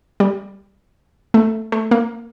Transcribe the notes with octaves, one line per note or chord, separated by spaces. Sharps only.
G3
A3
A3
A#3